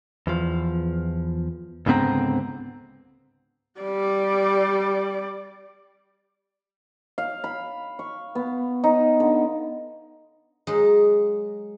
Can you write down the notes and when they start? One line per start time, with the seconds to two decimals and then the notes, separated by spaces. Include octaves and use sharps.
0.27 E2 F3
1.86 C#2 G#2 D3 B3 C4 A#5
3.80 G3 D5
7.18 F5
7.44 B5
7.99 C#6
8.35 B3
8.84 D#4
9.20 D3
10.67 F#3 G#3 D#4